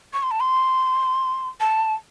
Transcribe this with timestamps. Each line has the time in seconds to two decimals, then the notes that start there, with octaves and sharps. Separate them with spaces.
0.13 C#6
0.23 C6
0.31 A5
0.40 C6
1.60 A5